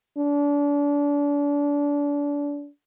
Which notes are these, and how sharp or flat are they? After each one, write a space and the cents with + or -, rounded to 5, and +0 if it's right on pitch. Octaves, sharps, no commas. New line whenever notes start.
D4 -30